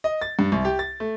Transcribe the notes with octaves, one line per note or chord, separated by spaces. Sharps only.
D#5
A6
G2
C2
G4
A6
A3